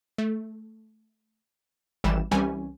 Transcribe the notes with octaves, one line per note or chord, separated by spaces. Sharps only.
A3
G#1 E3 G3 E7
C2 E3 G3 C#4 G#5